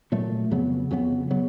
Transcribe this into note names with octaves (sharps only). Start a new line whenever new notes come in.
A#2 F#3 A3
F2 C#3 F#3 B3
F2 C#3 F#3 B3
C#3 F#3 B3